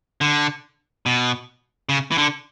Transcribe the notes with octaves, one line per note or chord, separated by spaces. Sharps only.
D3
B2
C#3
E3
D3